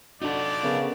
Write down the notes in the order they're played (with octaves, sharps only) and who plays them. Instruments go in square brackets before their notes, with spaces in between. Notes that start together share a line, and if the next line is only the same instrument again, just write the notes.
[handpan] D4 F#4 [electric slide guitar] D#4 A4 [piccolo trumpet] D5
[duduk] C#3 [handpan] B3 C#4 A#4